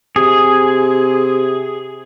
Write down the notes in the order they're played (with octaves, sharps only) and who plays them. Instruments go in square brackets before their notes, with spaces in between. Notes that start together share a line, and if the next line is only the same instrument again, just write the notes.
[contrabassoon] C3 [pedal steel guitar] G#4